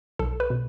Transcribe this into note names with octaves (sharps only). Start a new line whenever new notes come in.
B1 A4
B4
B2